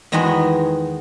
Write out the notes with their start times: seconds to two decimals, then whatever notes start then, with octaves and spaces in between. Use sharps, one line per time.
0.12 E2 D#3 G#3 B3 F#4 B5